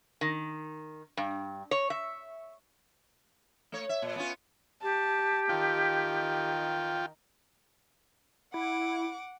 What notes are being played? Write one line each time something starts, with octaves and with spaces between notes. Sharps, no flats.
D#3
G2
C#5
E5
A3 C#5
E5
A#2
B3 C#4 F4
G4 A5
D#3 F4 G5
E4 F#5 D6